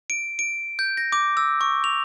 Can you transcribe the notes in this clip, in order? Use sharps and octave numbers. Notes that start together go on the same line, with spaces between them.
D7
D7
G6
A#6
D6
E6
C#6
F7